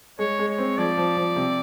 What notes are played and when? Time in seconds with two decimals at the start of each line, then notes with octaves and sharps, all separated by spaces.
0.19 G#3 C#5
0.39 G#3
0.48 C#5
0.58 C4
0.77 F3 D5
0.97 F3
1.17 F3
1.36 C3